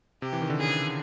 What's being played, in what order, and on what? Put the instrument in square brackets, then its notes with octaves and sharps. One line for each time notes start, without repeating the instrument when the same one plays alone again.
[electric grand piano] C3 [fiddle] G4
[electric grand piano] E3
D#3
D3
[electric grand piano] C#3 [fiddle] G#4